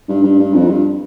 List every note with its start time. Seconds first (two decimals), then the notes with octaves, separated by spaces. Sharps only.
0.08 G2
0.23 G2
0.39 G2
0.53 F2
0.69 G2